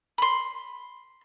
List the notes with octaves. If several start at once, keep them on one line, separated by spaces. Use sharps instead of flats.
B5 C6